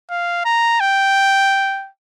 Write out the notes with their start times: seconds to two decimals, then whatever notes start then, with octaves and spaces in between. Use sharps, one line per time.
0.11 F5
0.45 A#5
0.80 G5